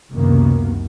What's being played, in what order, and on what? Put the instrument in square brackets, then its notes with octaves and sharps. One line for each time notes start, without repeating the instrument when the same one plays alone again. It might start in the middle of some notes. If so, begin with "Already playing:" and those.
[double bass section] C#2 F#2 C3 D#3 A#3 B3